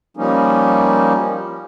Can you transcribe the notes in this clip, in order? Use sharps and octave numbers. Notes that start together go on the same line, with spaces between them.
F3 G3 A#3 C#4 D#4